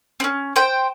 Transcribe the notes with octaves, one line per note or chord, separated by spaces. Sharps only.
C4 C#4
C5 G5